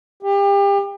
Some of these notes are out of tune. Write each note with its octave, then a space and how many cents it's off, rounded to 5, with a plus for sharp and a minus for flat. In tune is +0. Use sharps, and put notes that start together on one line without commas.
G4 +30